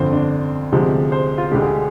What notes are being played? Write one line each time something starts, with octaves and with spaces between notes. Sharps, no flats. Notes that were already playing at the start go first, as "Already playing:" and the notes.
Already playing: G1 F2 D3 C5
D4
D2 C3 F3 G#3
C5
F4
D2 D3 G#3 G4
G#4